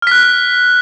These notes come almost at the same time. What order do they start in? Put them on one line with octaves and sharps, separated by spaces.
F6 B6 F#6